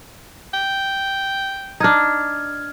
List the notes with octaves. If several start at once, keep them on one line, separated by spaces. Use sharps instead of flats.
G5
D4 D#4 F6 G#6